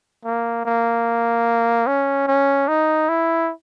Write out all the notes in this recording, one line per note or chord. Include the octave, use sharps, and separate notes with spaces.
A#3
A#3
C#4
C#4
D#4
E4